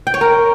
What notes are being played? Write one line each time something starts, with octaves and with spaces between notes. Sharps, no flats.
G5
C#5
A#4